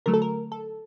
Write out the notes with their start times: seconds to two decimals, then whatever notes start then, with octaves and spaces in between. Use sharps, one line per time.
0.06 D3 F#3 A3 A#4
0.14 A4
0.22 A#4
0.52 A4